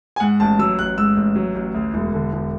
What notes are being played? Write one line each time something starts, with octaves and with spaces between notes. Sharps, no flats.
G#5
G#2 F#5
A1 A5
F#3 E6
A1 F#6
G#2 E6
A1
F#3
A1
D2
E1
D3
E1